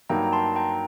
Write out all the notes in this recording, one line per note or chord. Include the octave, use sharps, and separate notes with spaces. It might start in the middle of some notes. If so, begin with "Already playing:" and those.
G2 F#3 A#3 D#4 G5 A#5
A5 C6
G5 A#5